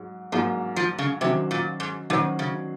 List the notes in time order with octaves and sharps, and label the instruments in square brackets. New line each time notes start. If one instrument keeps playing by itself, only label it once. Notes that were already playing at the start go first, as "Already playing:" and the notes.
Already playing: [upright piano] G#2 F#3
[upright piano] G#2 F#3 A#3 [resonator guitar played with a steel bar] F3
[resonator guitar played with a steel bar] F3
C#3
[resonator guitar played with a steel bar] C3 [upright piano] D#3 F#3 C#4 F#4 C5
[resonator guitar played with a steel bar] A#2
G#2
[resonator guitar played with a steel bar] A#2 [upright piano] D#3 F#3 C#4 F#4 C5
[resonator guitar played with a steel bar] C#3